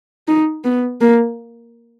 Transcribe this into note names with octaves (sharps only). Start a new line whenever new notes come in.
D#4
B3
A#3